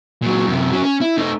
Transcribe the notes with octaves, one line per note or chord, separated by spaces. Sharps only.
A#2 F#3
F#2 C3
F#3 C#4
C#4
E4
A3 D#4